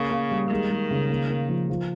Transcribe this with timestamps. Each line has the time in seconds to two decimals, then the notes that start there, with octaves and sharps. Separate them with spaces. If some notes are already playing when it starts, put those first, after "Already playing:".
Already playing: C#3 A#3
0.11 A#3
0.31 G3
0.50 D#3 G#3
0.70 G#3
0.91 C#3
1.10 A#3
1.30 A#3
1.49 F3
1.70 F3